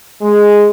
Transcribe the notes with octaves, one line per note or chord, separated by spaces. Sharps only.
G#3